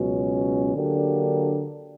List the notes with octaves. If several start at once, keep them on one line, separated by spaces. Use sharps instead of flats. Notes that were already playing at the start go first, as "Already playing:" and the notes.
Already playing: C#2 B2 F#3 C#4
D3 F#3 A#3 D4 G4